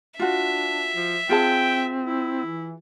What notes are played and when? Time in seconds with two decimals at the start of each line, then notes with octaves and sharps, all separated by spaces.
0.20 D4 F4 F#4 E5
0.95 F3
1.29 C4 F4 G#4 G5 A5
2.03 E4
2.45 E3